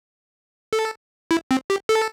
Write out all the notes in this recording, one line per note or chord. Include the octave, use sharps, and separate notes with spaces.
A4
E4
C4
G4
A4